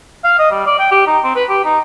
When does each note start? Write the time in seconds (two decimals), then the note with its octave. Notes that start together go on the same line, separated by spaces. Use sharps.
0.24 F5
0.39 D#5
0.51 G3
0.66 D5
0.79 G5
0.92 G4
1.07 D#4
1.24 C4
1.35 B4
1.49 G4
1.64 D#4